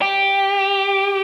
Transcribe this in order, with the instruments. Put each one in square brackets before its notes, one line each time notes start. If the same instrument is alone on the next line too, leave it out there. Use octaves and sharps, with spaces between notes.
[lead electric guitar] G4